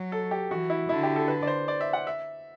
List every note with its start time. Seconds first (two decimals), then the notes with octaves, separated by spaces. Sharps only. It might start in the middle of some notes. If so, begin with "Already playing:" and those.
Already playing: F#3 F#4
0.12 A4
0.31 G4
0.51 E3 F#4
0.70 E4
0.89 D3 E4
1.03 G4
1.16 A4
1.28 B4
1.42 D5
1.47 C5
1.68 D5
1.81 E5
1.93 F#5
2.07 E5